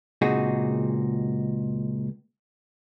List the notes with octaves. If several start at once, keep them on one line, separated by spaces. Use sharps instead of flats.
C#2 A#2 C4 D#4 F#4 G#4